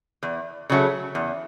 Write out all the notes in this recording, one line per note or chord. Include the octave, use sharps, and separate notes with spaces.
E2
C#3 F#3 A3
E2